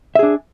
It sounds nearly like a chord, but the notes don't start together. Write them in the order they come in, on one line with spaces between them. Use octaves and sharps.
E5 G#4 D4